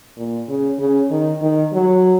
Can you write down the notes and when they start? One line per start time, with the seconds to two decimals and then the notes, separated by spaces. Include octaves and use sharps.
0.17 A#2
0.49 C#3
0.79 C#3
1.11 D#3
1.41 D#3
1.73 F#3